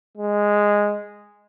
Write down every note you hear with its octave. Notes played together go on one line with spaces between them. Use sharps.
G#3